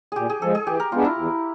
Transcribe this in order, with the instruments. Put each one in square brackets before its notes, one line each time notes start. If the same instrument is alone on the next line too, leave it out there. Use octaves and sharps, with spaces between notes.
[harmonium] A#2 [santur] G4 G#4
[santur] G#4
[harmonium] F3 G#3 [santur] A4
[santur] G#4
[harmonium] E3 [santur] G4
[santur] A#4
[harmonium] G#3 B3 D4 [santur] F4
[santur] E4
[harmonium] E2